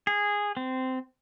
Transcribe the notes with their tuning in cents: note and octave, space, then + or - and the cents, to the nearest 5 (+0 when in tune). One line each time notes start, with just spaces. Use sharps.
G#4 -10
C4 -15